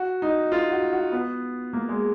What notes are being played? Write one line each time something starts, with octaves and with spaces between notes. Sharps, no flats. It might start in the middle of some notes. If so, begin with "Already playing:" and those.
Already playing: F#4
D#4
F4
F#4
F#4
B3
A#3
G#3